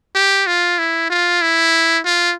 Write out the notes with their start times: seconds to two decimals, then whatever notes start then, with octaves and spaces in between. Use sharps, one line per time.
0.15 G4
0.47 F4
0.79 E4
1.10 F4
1.42 E4
2.05 F4